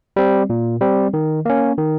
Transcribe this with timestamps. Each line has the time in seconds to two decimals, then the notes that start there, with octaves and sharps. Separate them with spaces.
0.16 G3 C4
0.50 A#2
0.81 G3 C4
1.14 D#3
1.45 A#3 C#4
1.78 D#3